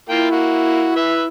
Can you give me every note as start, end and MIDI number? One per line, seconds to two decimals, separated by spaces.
0.09 0.27 58
0.09 1.28 64
0.09 0.27 65
0.09 0.27 79
0.31 0.91 58
0.31 0.91 66
0.96 1.24 71
0.96 1.24 76